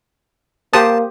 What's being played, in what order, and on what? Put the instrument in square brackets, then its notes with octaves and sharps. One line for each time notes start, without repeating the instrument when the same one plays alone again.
[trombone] A#3 [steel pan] G4 C5 D#6 [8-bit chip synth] A5